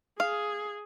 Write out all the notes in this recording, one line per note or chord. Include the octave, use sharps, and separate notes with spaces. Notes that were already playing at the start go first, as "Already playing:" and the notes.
G#4 F5